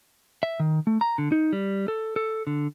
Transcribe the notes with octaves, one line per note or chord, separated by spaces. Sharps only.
E5
D#3
A3
A#5
D3
D#4
G3
A4
A4
D3